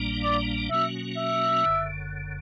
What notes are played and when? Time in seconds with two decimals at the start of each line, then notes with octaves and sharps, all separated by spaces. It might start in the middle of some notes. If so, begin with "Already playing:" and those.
Already playing: A#1 A#2 G3 A#3 D4
0.23 D5
0.70 B2 F#3 A#3 C#4 F#4 E5
1.18 E5
1.65 F#1 F#2 D3